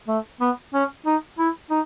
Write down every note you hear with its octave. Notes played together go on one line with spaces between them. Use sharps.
A3
B3
C#4
D#4
E4
D#4